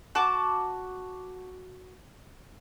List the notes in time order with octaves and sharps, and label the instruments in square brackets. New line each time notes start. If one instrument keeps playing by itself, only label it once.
[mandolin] F#4 A5 D6